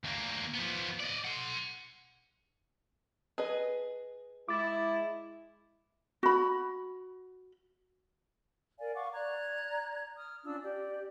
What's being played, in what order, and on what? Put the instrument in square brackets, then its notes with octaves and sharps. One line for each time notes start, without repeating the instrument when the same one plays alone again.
[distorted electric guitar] D2 A#3
F3 B3
D5 D#5
F#5 C6
[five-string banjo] G#4 B4 D#5
[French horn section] G#3 E4 [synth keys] D6 A6
[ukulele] F#4 B5
[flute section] A#4 D5 F5 G#5
F5 F#5 C#6 D6
D5 A#5 F#6 G#6
D#6 F6
C#4 D4 F4 E6
G4 D5